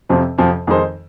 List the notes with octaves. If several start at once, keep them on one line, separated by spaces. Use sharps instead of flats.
F2 C3 F3 C4
F2 C3 F3 C4
F2 D#3 G#3 D#4 C5